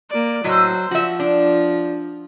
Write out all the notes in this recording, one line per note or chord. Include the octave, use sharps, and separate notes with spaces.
A#3 D5
A2 F#3 A3 C5 D#5
F3 F#4 E5
D4